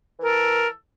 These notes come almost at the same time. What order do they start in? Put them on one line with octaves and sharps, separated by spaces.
E3 A#4 A4